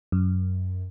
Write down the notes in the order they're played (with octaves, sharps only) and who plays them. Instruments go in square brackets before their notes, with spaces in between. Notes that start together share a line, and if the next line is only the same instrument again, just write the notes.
[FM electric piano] F#2